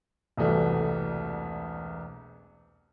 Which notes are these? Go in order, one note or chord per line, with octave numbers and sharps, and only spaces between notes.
E1 C2 C3 E3 A3 F#4